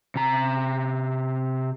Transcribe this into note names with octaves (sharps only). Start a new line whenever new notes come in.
C3 A#5